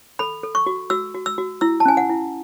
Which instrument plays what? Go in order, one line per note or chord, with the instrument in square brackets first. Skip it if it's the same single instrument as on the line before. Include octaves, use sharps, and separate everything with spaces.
[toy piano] A4 B5
A4
C#6
F#4
F#4 E6
F#4
E6
F#4
E4 E6
A5
C#4 G#5
F#5
E4